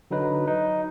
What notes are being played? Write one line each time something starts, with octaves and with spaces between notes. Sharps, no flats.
D3 F#3 D#4 B4
D#4